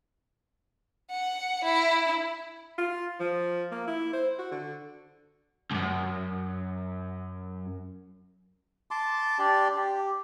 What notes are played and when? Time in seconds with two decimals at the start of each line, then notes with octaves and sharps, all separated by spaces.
1.11 F#5
1.64 E4
2.78 F4
3.20 F3
3.71 A#3
3.87 E4
4.13 C5
4.39 F#4
4.51 D3
5.71 C2 F#2
8.91 A5 C6 D6
9.39 D4 G4 D5 C6
9.77 G4